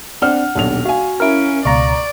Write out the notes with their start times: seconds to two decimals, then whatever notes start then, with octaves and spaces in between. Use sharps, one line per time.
0.22 C4 D4 F#5 F6
0.55 D#1 B1 D4 F7
0.85 F#4 F5 G#5
1.20 C#4 E4 A#4 F6 D7
1.65 C#2 B2 D5 F5 A#5 C#6